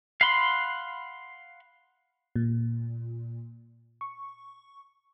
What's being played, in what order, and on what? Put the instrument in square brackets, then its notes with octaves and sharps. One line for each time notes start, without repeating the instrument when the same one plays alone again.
[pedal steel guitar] F5 F#5 B5 C6
[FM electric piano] A#2
C#6